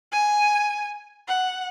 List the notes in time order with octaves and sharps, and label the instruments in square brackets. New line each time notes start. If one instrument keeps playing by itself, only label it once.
[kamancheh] G#5
F#5